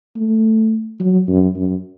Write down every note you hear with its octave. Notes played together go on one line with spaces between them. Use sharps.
A3
F#3
F#2
F#2